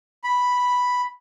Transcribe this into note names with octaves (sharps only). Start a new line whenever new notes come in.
B5